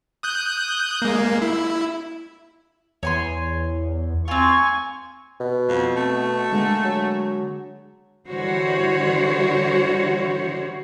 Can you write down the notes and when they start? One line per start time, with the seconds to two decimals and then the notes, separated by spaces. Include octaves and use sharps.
0.23 D#6 F#6 G6
1.02 G#3 A#3
1.42 E4
3.03 E2 C#5 G#5 C6
4.28 C4 F4 G#5 C#6
5.40 B2
5.69 F2 C4
5.96 A3
6.51 D3 G#3 A#3
6.85 F#3
8.27 D3 E3 G3 F#4 C5 C#5